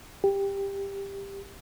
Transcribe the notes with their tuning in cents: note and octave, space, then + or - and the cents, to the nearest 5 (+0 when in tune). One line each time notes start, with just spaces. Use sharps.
G4 +15